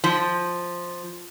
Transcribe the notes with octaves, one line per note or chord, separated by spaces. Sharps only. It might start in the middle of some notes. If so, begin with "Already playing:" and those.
F3